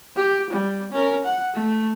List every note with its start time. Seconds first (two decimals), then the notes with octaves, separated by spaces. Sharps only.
0.16 G4
0.51 G3
0.92 C#4 A#4
1.25 F#5
1.54 A3